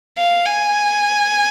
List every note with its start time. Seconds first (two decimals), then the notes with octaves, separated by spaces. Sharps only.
0.18 F5
0.46 G#5